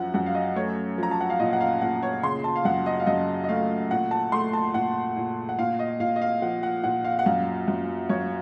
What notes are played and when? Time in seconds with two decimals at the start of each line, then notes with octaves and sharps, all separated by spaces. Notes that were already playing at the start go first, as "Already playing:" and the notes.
Already playing: F#2 F3 F#5
0.14 F#2 F#5
0.26 F5
0.35 D#5
0.56 A3 C#5
0.98 F3 A#5
1.11 A5
1.20 F#5
1.30 F5
1.39 A#2 D#5
1.53 F#5
1.61 F5
1.81 A#2 F#5
2.03 C#5
2.23 C#3 C6
2.44 A5
2.56 F5
2.65 F#2 F#5
2.86 D#5
3.00 F5
3.06 F#2 D#5
3.44 D#5
3.49 A3 F5
3.91 A#2 F#5
4.11 A5
4.32 A3 C6
4.53 A5
4.74 A#2 F#5
5.16 A#2
5.49 F#5
5.58 A#2 F5
5.79 D#5
6.00 A#2 F5
6.16 D#5
6.22 F5
6.42 F3 F#5
6.63 F#5
6.84 A#2 F#5
7.04 F5
7.19 F#5
7.26 F#2 F5
7.68 F#2
8.09 F#2 C#5